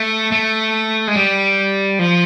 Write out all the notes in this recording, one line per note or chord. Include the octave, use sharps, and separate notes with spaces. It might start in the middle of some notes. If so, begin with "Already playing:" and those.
Already playing: A3
A3
G#3
G3
F3